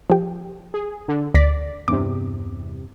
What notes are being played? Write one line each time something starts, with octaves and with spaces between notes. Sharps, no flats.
F3 G4
G#4
D3
D2 D5 A#6 B6
E2 G2 C3 D6